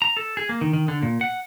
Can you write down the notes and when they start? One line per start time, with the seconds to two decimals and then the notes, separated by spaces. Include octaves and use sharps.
0.02 A#5
0.17 A4
0.37 G#4
0.49 A#3
0.61 D#3
0.73 D#3
0.88 D3
1.03 A#2
1.21 F#5